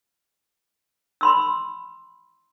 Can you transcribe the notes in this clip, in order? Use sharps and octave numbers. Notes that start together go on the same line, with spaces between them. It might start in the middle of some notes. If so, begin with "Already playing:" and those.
B5 C6 E6